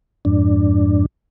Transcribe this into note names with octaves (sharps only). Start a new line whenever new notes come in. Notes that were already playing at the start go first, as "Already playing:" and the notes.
F2 G#2 D4